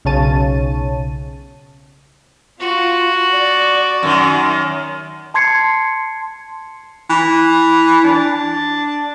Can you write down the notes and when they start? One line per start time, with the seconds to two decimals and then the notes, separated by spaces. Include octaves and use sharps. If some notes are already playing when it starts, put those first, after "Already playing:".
0.05 B1 C#3 C#5 A5 D#7
2.60 F4 F#4
3.30 D5
4.03 F#2 D#3
5.34 A5 C6 G#6 C7 C#7
7.10 E3
8.04 D4